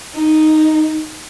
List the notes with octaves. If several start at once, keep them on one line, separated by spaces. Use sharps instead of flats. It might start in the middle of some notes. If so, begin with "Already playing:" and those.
D#4